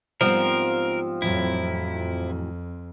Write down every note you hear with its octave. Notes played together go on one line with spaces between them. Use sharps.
G#2 F3 G3 B3 C4 A#4
F2 A2 E3 F#3 E4